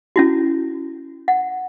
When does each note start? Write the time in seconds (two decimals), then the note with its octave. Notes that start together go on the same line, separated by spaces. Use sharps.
0.16 C#4 E4 F#4
1.28 F#5